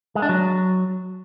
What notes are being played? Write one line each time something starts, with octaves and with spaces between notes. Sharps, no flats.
G#3
D4
F#3